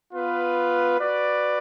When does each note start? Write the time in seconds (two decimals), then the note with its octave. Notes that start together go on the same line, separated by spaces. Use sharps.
0.13 B3 F4 B4
1.00 F#4 B4 D5